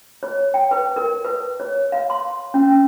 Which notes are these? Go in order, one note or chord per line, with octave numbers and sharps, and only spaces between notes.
C#5
G5
B4
A#4
B4
C#5
F5
C6
C#4